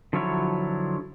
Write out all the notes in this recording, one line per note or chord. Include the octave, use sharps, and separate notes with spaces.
D3 F3 F#3 E4 C#5